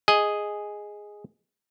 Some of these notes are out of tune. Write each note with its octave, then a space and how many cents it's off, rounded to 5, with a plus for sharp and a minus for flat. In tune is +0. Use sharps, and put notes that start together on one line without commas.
G#4 +0 D#5 +0 G#5 +0